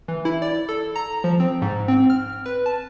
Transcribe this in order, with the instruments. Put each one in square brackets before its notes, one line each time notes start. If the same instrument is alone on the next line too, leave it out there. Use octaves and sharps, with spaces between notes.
[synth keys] E3
E4
D5
A4
A#5
F3
C4
G#2
C4
F6
B4
A5